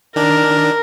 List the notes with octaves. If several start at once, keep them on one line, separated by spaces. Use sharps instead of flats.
D#3 D4 A#4